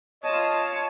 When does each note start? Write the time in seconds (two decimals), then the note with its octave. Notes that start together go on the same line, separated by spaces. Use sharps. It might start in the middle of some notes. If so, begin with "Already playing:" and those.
0.24 F4 C#5 D#5 A5